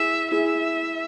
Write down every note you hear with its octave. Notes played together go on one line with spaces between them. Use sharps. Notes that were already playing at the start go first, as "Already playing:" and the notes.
Already playing: E4 G#4 E5
E4 G#4 E5